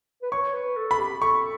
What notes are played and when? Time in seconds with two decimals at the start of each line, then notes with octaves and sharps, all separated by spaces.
0.22 B4
0.32 C#5 C#6
0.54 B4
0.76 A4
0.91 B5
0.99 G4
1.17 G4
1.21 A4 C#6